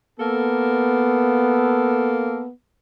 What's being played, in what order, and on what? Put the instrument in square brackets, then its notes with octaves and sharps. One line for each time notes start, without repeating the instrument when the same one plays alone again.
[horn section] A#3 A4 [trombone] B3